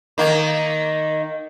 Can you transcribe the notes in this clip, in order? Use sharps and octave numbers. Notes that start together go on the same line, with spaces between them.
D#3 A#3